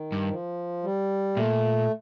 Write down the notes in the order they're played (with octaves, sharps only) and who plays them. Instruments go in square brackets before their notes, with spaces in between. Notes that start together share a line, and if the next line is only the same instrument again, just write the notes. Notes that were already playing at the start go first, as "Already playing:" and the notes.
Already playing: [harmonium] D#3
[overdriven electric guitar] G2
[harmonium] F3
G3
[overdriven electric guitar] A#2 [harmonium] A3